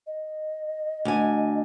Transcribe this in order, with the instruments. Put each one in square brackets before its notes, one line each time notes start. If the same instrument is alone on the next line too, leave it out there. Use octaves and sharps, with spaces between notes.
[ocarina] D#5
[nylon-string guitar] D2 G#5